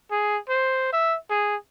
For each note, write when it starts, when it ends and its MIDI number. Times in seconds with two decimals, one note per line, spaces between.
0.11 0.38 68
0.49 0.90 72
0.93 1.16 76
1.30 1.56 68